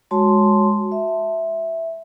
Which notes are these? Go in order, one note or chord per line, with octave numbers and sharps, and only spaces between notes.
G#3 F#4 C#5 A5 C6
E5